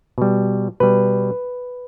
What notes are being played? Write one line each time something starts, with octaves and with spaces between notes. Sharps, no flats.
B2 G3
B2 G3 B4